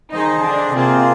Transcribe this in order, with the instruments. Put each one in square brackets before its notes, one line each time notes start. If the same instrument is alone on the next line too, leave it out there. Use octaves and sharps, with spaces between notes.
[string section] D#3 D#4 [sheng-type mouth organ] G#4 C5 D#5
[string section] D3 D4
[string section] C3 C4 [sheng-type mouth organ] A#3 F4 G#4